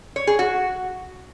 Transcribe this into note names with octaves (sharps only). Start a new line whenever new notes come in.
C#5
G#4
F#4